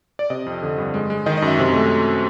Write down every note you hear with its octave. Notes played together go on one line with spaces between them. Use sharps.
D5
C3 D#5
F2
D3
G2
G#3
G#3
D#3 D#5
D#5
F#2
E5
C3
A3